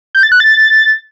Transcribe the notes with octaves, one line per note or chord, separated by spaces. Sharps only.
G6
A6
F#6
A6